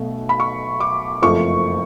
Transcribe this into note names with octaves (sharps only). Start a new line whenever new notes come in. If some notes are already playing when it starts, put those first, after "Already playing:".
Already playing: B1 B2 A3
B5
C#6
D6
F#1 F2 F3 A3 C#6